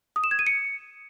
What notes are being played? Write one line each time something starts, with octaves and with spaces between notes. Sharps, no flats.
D#6
E7
G#6
D#7
C#7